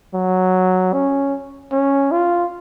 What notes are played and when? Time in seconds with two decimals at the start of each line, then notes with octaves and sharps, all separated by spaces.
0.14 F#3
0.94 C#4
1.72 C#4
2.12 F4